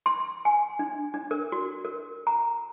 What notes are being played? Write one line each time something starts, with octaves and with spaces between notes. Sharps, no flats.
C6
G#5
D4
D4
A#4
F#4
A#4
A#5